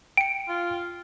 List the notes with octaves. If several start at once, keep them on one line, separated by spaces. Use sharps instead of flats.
G5 C#7 D7
F4